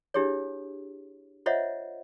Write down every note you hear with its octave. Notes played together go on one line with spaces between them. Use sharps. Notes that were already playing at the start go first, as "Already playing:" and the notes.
D4 E4 G4 G#4 C#5
F4 C5 C#5 D#5 E5 F#5